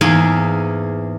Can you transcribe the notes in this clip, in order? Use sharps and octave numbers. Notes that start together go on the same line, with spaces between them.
E2 G#2 A#3 G#4 G5 G#5